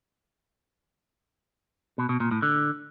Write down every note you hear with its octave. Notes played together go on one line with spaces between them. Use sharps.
B2
B2
A#2
A2
D3